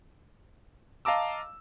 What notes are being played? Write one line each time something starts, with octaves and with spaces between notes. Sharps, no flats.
D#5 F5 A5 A#5 D6 E6